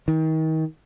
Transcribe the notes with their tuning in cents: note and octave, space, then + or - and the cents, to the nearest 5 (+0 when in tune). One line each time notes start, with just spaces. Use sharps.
D#3 +35